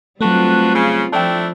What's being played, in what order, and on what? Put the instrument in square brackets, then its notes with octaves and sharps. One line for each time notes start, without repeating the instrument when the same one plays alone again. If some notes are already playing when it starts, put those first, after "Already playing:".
[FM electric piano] F#3 A3 [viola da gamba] G3 C4 F4 [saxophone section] D4 F#4 B4
[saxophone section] C#3
[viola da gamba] F3 [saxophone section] A3 D4 E4 [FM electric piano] G5 A5